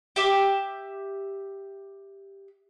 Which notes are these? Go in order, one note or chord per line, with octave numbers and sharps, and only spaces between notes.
G4 E5 D6